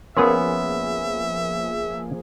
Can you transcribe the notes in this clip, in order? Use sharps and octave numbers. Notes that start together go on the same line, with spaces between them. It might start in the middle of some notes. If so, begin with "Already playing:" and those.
F3 A#3 B3 C#4 G#4 A#4 E5 C6